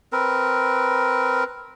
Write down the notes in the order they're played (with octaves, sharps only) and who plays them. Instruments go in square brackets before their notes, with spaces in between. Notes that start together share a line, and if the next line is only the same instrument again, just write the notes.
[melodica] C4 A#4 B4